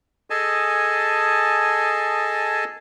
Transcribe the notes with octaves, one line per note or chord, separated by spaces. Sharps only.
G#4 A4 D#5 G#5 A5